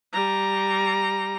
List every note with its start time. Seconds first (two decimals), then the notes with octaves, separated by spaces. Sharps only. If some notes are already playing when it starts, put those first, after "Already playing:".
0.13 G3 A#5